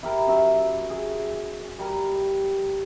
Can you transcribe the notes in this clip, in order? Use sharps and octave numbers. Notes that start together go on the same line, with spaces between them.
E4 G4 A#4
F#2 E5
G#4
G3 A#4